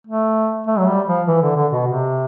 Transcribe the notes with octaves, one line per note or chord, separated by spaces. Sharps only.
A3
A3
F#3
G3
F3
E3
D3
D3
B2
C3